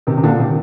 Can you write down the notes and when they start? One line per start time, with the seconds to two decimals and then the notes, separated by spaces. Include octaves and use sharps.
0.07 C3 D#3
0.17 C3
0.23 A#2 D3
0.39 C3 D#3